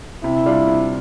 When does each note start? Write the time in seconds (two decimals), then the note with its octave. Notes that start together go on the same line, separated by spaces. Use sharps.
0.24 C3 E4
0.46 G3 D4 F4
0.67 C3